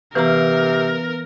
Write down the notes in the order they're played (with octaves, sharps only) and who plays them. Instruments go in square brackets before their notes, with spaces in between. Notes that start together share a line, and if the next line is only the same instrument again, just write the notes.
[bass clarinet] C3 [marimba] E3 A#5 [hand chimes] B3 B4 F6 [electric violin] A#4